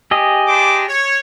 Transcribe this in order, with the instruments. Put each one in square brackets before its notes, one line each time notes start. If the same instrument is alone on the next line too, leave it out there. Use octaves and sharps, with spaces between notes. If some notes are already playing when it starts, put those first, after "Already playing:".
[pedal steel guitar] G4 G#4 D#5
[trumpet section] D4 C5 D6
C#5